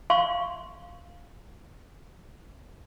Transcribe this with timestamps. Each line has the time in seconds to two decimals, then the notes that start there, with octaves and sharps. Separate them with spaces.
0.10 F5 C6 C#6